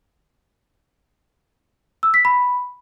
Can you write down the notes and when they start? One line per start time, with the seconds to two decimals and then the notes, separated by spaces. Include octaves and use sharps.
2.03 E6
2.14 B6
2.25 B5